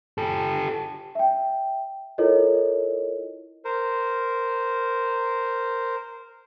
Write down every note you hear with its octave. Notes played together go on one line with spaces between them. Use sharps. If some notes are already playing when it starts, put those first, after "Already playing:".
G4 A4
E5 G5
E4 F4 A4 A#4 C#5 D#5
A#4 C5